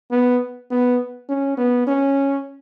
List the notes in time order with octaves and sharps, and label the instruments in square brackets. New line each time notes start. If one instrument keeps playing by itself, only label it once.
[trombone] B3
B3
C#4
B3
C#4